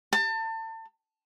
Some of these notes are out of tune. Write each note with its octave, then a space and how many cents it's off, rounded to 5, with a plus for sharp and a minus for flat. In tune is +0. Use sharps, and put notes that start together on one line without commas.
A5 +30